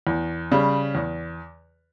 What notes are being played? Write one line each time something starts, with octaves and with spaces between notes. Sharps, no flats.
E2
C#3 G3
E2